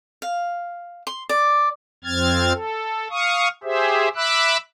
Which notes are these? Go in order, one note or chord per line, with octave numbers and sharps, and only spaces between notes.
F5
C6
D5
F2 C4 F6 G#6 A6
A4
F5 C#6 D#6
G4 G#4 C5 E5
E5 B5 D6 E6 F#6